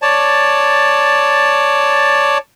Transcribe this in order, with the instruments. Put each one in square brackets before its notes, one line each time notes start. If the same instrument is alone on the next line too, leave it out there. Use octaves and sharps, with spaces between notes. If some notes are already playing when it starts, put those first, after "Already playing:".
[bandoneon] C#5 D5 A5